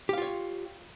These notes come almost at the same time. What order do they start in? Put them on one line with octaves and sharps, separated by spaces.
G4 F5 F4 C#5